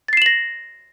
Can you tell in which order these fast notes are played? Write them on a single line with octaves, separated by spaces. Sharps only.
A6 C7 E7 F#7 A#6